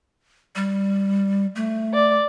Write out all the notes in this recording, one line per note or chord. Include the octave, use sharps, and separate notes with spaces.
G3
A3
D5